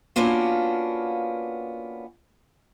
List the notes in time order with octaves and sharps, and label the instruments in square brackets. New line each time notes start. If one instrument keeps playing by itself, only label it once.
[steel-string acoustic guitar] A#3 B3 C#4 D4 F4 F#4